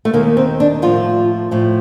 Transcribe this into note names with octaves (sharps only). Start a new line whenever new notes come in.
A3
D#2 D#3 A#3
C4
D4
A2 F3 F4
A2 F3